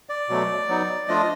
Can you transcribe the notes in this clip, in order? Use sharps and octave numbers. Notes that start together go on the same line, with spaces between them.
D5
B2 F#3 A3
F#3 B3 D#4
F3 A3 D4 F4 D#5